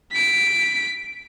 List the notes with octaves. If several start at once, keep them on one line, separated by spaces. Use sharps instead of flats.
B6 D7